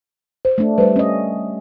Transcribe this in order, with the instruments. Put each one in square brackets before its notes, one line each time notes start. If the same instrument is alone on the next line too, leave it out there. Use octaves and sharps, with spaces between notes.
[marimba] C5
[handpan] A3 D4
[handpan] G3 [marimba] B4 C5
[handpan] C#4 D#5